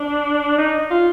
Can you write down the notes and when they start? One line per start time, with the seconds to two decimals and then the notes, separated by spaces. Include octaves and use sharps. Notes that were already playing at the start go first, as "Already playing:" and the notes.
Already playing: D4
0.58 D#4
0.91 F4